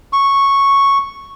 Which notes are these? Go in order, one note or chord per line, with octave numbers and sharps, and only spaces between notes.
C#6